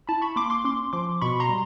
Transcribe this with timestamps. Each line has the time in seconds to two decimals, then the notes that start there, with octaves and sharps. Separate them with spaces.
0.07 E4 A5 B5
0.22 B5 C#6
0.36 A#3 C6 D6
0.50 C6 D6
0.64 C#4 C6 D6
0.93 F3 C6 D6
1.21 B2 B5 C#6
1.40 A#5 C6
1.49 G3